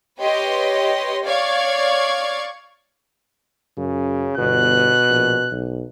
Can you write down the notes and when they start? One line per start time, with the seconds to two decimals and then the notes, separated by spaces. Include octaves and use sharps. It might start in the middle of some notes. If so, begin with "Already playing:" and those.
0.19 G4 B4 C#5 D#5 C6
1.24 C#5 D5 F5 C#6 G#6
3.77 F#2 C#3
4.38 G1 B2 F#6
5.09 A#1
5.52 B1